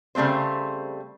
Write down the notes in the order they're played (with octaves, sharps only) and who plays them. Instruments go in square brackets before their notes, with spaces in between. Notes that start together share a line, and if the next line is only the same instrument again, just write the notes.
[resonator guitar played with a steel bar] C#3 G3 A3 C4 C5